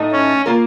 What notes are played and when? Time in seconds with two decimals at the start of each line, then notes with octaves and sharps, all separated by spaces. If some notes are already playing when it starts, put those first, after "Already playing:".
Already playing: A2 A3 D#4
0.12 C#4
0.46 A#3 F4 A#4